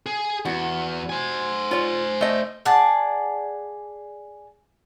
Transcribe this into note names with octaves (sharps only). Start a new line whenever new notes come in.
G#4
E2 F#4
C5 G#5
F4 C#5
A3 D#5
G#4 D5 F#5 A5